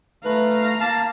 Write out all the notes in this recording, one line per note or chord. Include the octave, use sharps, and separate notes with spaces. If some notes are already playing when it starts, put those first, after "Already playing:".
A3 B4 F5 A#5
A#3 A5